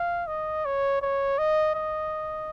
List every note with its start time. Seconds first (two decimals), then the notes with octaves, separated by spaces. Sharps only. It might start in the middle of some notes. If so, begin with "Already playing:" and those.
Already playing: F5
0.27 D#5
0.65 C#5
1.02 C#5
1.38 D#5
1.75 D#5